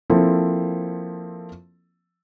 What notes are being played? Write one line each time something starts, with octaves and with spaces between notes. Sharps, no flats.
F3 A#3 C4 E4 A4